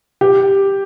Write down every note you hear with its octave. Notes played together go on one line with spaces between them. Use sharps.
G4